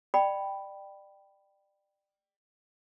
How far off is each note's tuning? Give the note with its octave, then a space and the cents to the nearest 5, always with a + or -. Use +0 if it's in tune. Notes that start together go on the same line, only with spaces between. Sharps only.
D5 +25 G5 +0 B5 +0